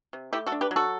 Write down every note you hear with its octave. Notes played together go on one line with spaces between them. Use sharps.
C3
A3 E4 G4
F#4 A4
D4
G4 B4
F#3
F#4 A4